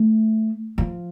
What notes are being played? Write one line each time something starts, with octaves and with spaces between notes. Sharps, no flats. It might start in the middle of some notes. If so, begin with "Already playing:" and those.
Already playing: A3
F3